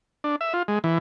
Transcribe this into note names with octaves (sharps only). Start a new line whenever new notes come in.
D4
E5
F4
G#3
E3